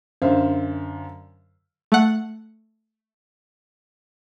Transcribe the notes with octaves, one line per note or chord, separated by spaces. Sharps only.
F#2 D3 C5 E5 F5
A3 F#5